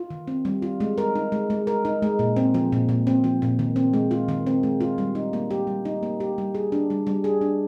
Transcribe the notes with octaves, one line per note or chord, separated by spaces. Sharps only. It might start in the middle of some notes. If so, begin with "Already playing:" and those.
Already playing: F4
D#3
C4
G3
F4
G#3
A#4
D#4
G#3
G#3
A#4
D#4
G#3
A#2
C4
F3
A#2
A#2
C4
F3
A#2
D#3
C4
G#3
F4
D#3
C4
G#3
F4
G3
D#4
A#3
G4
G3
D#4
A#3
G4
G3
G#4
D4
G3
G3
G#4
D4